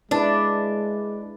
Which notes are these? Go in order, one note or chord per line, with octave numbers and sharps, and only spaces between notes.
G#3 D4 E4 B4 D5